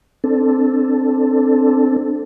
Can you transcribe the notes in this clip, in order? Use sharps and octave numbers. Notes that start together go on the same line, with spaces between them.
C4 D4 A4